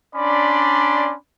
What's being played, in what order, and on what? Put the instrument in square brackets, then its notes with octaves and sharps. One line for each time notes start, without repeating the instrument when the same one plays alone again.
[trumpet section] C#4 D4 D5 B5 C6